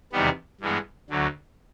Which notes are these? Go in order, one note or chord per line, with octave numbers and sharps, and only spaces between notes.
E2 C3 D#3 G3 B3
G2 E3 G#3 B3
D2 D3 F#3